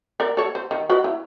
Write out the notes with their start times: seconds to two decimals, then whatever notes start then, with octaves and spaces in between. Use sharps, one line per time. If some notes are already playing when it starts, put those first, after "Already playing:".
0.20 A#4 D5
0.37 A4 C#5
0.55 C5
0.71 D#3
0.89 F#4 B4 D#5
1.04 E4